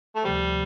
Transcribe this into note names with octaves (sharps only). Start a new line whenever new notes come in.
A3
D2 C3 F3 G3